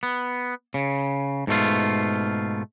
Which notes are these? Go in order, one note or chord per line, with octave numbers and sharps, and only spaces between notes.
B3
C#3
G#2 B2 A3 F4